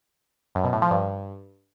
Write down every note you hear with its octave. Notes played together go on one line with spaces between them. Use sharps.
F#2
B2
A2
F3
G2